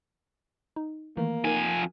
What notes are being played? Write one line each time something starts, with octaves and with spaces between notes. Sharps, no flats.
D#4
D#3 E3 A3 A#3
F2 D#4 A#4 G#5